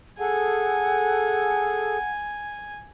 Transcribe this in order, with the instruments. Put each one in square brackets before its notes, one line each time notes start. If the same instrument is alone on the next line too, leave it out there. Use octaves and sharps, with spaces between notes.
[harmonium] G#4 A4 [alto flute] F#5 [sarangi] G#5